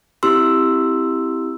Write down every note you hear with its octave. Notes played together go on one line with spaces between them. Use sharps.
C4 E4 G4 C6 E6